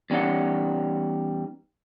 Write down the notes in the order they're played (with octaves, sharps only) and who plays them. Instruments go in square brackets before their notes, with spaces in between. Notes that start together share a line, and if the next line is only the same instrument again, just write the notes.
[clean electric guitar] E2 G3 C#4 D#4 F#5